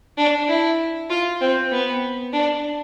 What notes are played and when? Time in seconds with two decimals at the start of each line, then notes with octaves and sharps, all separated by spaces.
0.18 D4
0.48 E4
1.10 F4
1.41 C4
1.72 B3
2.33 D4